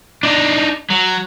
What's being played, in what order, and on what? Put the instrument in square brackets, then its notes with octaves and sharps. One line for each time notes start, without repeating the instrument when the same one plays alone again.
[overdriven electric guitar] D4 D#4
F#3